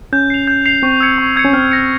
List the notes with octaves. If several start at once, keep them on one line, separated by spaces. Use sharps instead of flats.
C#4 G6
C7 F7
G6
C7 F7
C4 C#6
E6 G#6 C#7
C#6
E6 G#6 C#7
C#4
C4 F6
A#6 C#7